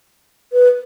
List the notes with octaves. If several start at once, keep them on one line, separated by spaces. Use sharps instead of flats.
B4